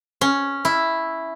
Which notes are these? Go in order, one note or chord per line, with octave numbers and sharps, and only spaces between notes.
C#4
E4